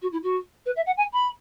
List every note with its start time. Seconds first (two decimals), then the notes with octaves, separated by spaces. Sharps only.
0.02 F#4
0.12 E4
0.23 F#4
0.65 B4
0.76 E5
0.86 F#5
0.97 G#5
1.12 B5